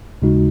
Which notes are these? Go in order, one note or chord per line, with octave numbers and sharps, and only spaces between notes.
D#2 C#3 G#3 D#4 F#4